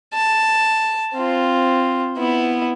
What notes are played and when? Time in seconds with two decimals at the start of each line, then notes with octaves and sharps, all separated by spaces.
0.14 A5
1.14 C4 F4
2.18 B3 E4